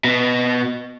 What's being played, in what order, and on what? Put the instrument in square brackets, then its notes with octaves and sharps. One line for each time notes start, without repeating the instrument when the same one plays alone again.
[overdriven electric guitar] B2